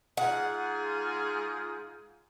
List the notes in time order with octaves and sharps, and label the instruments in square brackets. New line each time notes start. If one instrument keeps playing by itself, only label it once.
[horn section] G#2 F4 G#4 [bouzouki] F#5